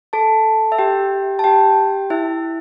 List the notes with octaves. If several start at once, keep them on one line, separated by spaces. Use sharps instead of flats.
A4 A5
E5
G4 G5
A5
G4 G5
E4 E5